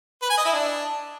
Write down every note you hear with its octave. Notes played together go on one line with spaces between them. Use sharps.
B4
G#5
D#5
E4
D4